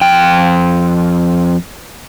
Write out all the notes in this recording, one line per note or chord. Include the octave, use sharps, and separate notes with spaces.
F2 G5